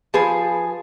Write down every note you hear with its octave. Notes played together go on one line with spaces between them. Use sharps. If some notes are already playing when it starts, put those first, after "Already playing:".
F3 G#4 B4